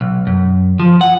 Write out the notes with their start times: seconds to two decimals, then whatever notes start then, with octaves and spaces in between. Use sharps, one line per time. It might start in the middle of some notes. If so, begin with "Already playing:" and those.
0.01 B1
0.27 F#2
0.80 F3
1.01 F#5